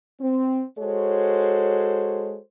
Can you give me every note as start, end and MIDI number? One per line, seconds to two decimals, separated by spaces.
0.21 0.62 60
0.79 2.39 56
0.79 2.39 66
0.79 2.39 69
0.79 2.39 72
0.79 2.39 73